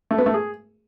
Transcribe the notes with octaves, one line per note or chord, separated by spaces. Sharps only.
A3
B3
A3
G#4